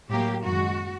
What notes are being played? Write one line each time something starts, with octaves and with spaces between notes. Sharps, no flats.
A2 F#3 A#3 G4
F#2 D#3 G#3 F#4